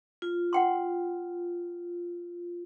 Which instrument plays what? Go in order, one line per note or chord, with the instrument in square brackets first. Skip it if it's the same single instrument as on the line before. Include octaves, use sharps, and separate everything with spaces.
[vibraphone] F4
[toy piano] F#5 G5 C6